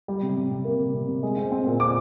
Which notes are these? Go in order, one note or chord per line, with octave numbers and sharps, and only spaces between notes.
G3
C3
C3
C3
A#3
C3
C3
C3
G#3
C4
C4
A#2
C4 D6